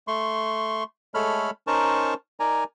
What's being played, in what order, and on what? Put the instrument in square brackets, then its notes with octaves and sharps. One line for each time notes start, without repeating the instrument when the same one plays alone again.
[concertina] A3 C6 C#6
G#3 A3 A4 C#5 B5 F6
C#4 D#4 A#4 C5 A5 C#6
D#4 A#4 D5 G#5 A#5